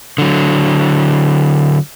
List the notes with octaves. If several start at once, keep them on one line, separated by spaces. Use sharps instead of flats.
D3 F#3